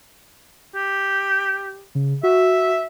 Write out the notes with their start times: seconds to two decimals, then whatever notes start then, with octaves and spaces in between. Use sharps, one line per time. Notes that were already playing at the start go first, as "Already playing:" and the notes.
0.75 G4
1.95 C#3
2.23 F#4 E5